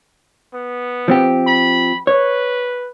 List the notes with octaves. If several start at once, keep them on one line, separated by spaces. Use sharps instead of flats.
B3
F3 C4 G4
B5
B4 C#5